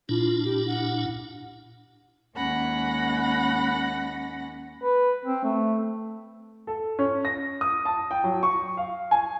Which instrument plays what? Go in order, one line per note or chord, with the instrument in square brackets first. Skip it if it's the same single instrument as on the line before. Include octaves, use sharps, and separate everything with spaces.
[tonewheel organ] A#2 D4 E4 [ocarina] F4
[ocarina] G4
F#5
[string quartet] D#2 G#3 C#4 F#5 B5 A#6
[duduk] B4
C4
A3
[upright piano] A4
C#4
A#6
D#6
A5
G5
F#3
C#6
F5
G#5